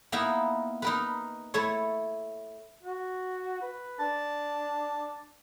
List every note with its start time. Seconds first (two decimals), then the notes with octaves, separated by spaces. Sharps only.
0.12 A#3 B3 D#4 E4 A#4 B4
0.82 D#4 A#4 B4
1.54 A3 E4 C#5
2.83 F#4
3.62 B4
4.00 D4 A5